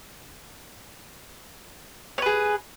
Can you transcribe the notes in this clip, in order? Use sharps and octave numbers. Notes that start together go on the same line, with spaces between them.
G#4 B4 C#5